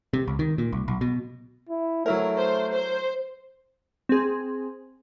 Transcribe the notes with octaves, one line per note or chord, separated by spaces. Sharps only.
C3
C#2
D#3
A#2
C2
B1
B2
E4
F#3 A3 E4 A#4
C5
C5
C4 G#4